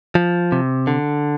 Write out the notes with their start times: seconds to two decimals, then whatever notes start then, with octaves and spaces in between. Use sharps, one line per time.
0.15 F3
0.52 C3
0.87 D3